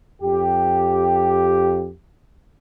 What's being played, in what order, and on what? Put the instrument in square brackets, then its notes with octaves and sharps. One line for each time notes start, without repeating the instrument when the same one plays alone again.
[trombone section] F2 G4